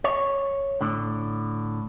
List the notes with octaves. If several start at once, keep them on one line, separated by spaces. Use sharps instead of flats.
C#5
A2 D3